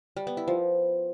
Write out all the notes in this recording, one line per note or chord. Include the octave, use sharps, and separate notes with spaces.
G3
B3
E4
F3